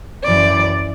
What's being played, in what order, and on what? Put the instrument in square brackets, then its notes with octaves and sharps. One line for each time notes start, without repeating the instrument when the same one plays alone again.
[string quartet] F#2 E3 D5